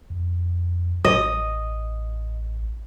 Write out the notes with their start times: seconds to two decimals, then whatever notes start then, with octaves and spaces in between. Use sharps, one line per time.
0.10 F2
1.05 A1 D#5